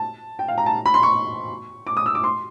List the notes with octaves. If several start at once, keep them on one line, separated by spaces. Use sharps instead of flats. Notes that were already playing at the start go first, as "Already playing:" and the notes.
Already playing: A5
G5
F5
A#5
A5
B5
C6
C#6
D6
D#6
E6
D6
C6